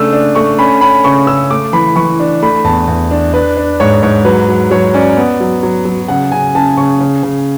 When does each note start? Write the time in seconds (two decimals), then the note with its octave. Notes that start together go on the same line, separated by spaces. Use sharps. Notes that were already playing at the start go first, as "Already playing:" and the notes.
Already playing: C#3 A3 D4 E6
0.13 D4
0.35 A3 C#6
0.59 C#4 B5
0.81 C#4 B5
1.04 C#3 C#6
1.27 C#3 E6
1.50 A3 D6
1.73 E3 B5
1.96 E3 C#6
2.20 D4
2.42 A3 B5
2.64 E2 A5
2.88 E2
3.11 D4
3.33 D4 B4
3.57 D4
3.80 G#2 C#5
4.03 G#2 C#5
4.25 F#3 B4
4.49 F#3
4.71 F#3 C#5
4.94 C#4 D5
5.17 B3
5.40 F#3
5.63 F#3
5.85 F#3
6.08 C#3 F#5
6.32 C#3 G#5
6.55 C#3 A5
6.77 C#3 C#6
7.00 C#3
7.23 C#3